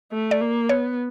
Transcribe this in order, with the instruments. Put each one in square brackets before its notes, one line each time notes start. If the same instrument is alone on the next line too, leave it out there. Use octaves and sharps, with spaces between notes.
[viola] A3
[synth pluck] D5
[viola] A#3
[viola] B3 [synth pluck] C#5